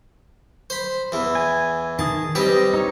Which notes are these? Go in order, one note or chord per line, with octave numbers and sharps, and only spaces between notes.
C5 B5
E2 E3
G#5
D#3 G#4 A5 D#6
G3 C4 G4 B4 D#5
D#4 C#5